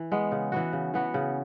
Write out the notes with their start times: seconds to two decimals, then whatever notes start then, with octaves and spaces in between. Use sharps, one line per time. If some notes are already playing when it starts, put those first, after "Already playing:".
Already playing: E3
0.12 G#3 B3
0.32 C#3
0.52 E3 B3 F#4
0.73 C#3
0.94 E3 B3 F#4
1.14 C#3